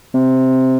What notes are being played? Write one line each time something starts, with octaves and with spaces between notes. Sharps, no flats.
C3